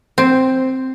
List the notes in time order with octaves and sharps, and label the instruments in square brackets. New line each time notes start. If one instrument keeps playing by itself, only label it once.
[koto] C4